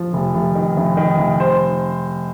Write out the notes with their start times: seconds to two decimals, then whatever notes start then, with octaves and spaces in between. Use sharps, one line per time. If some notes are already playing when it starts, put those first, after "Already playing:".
Already playing: F3
0.13 F1
0.34 F1
0.55 D#3
0.77 F1
0.97 D#3
1.19 F1
1.40 C5